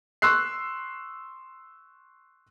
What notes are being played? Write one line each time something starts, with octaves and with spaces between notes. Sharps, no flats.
C6 C#6 E6 F#6 C7